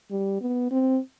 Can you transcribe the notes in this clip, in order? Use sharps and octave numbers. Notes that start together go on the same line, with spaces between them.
G3
B3
C4